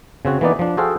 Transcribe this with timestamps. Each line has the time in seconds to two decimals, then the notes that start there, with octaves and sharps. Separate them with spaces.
0.25 C#3 C4 F#4 C#5
0.41 E3 A#3 B3 D#4 D5
0.59 F3 D4
0.77 F#4 G#4 A4 C5 F5 G5